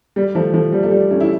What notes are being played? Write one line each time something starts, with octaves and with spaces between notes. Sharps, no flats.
G3
F3 A3
F3 A3
G3
A3
G3
A3 C#4
E4